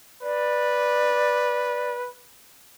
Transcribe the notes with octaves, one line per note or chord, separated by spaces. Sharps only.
B4 D5